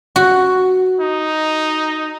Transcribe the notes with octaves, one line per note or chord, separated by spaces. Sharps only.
F#4
D#4